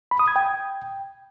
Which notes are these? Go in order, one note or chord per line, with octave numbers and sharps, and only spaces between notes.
B5
D#6
G#6
G5